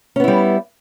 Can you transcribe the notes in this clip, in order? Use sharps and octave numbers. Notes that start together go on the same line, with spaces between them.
G3 B3 C#4 E4